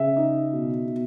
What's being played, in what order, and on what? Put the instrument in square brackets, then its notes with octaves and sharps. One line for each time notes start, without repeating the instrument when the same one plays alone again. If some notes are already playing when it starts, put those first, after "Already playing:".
Already playing: [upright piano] C#3 E5
D#4
B2
B2